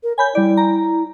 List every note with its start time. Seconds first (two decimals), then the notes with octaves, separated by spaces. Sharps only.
0.03 A#4
0.18 C#5 G#5 B5 G6
0.35 G3 E4 D5
0.57 A#5